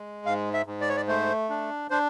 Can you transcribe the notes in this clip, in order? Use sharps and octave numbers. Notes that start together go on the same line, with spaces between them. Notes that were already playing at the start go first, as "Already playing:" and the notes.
Already playing: G#3
G#2 F5
E5
G#2
D5
C#5
D5
A3 C5
D4
D4 C5